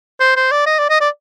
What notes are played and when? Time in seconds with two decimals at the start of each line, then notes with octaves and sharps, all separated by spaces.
0.20 C5
0.36 C5
0.51 D5
0.66 D#5
0.79 D5
0.90 D#5
1.01 D5